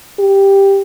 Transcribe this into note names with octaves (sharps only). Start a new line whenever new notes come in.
G4